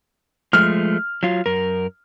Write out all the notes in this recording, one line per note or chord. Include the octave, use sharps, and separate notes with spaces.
F3 G#3 A3 F6
F#3 F4
F#2 A#4